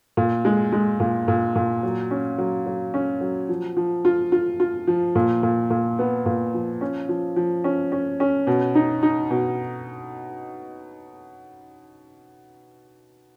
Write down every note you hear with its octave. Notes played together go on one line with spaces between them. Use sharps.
A#2
G#3
G#3
A#2
A#2
A#2
F#3
C#4
F#3
F#3
C#4
F#3
F3
F3
F4
F4
F4
F3
A#2
A#2
A#2
B3
A#2
F3
C#4
F3
F3
C#4
C#4
C#4
B2
D#4
D#4
B2